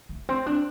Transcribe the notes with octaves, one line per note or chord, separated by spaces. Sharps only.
A3
C4
D4